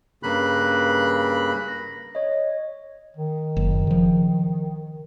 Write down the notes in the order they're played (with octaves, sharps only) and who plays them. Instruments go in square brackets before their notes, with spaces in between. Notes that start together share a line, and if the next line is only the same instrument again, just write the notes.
[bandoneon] G2 C#3 A#3 B5 F#6
[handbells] A#6
C#5 D#5
[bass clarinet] D#3
[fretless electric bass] F#1
C#3 F3